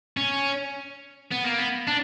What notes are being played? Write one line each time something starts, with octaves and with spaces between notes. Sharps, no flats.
C#4
B3
A#3
B3
D4